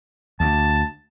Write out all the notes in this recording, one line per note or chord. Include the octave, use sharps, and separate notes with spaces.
D2 A5